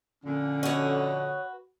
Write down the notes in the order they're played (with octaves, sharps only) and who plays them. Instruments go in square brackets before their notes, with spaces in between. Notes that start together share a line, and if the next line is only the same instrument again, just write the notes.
[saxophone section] F2 A#2 D3 [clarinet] C#4
[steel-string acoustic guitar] F#4 B4 [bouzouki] C#5 D#5